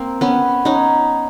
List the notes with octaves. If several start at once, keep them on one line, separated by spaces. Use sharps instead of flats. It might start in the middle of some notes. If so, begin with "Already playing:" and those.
Already playing: A#3 C4
B3 C#4
C#4 D#4